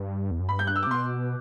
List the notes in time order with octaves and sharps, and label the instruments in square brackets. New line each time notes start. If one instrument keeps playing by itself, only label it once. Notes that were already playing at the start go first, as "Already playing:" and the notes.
Already playing: [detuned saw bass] G2
E2
F#2
[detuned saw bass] G2 [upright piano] B5
[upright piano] G6
F#6
E6
D6
[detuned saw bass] C3
[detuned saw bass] B2 [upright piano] C6